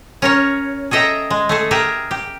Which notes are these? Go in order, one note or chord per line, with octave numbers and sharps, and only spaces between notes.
C#4 A#4 C#5
G#4 A4 D#5 E5 G5 A#5
G#3
A3 G#4 A4
G4 G#4 A#4 E5
G4